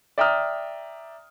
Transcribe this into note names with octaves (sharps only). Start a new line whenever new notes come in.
D5 E5 G5 A#5 D#6 F6